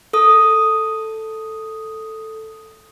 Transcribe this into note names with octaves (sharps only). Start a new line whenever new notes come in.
A4 D#6